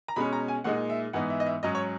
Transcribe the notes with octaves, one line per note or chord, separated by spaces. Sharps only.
A#5
B2 G#3 C#4 B5
A#5
G#5
A#2 G#3 D#4 F#5
E5
G#2 E3 B3 D#4 F#5
E5
D#5
E5
G#2 F#3 C#4 D#5
C#5